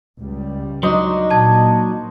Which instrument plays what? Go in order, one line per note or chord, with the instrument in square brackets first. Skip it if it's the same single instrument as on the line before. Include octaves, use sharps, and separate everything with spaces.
[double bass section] C#2 G3
[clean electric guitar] F#3 D4 D#4 [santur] C5 D#5
[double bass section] A#2 [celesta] A5 G#6